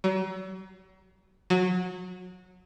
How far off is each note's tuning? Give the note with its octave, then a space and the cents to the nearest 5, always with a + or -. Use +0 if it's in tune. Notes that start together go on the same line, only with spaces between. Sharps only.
F#3 +40
F#3 -20